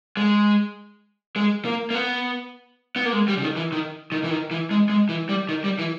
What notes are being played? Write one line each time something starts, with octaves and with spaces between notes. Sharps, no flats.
G#3
G#3
A#3
A#3
B3
B3
A#3
G#3
G3
C#3
D#3
E3
D#3
D#3
E3
D#3
E3
G#3
G#3
E3
G3
D#3
G3
E3